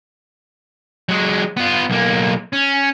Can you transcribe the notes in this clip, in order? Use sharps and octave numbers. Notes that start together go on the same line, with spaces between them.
F#3 G#3
B3 F4
B1 A#3
C#4